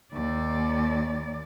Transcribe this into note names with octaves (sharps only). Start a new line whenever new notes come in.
D#2 D5